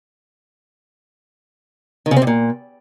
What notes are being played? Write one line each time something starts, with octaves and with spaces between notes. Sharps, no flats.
D#3
C#3
C4
C3
A#2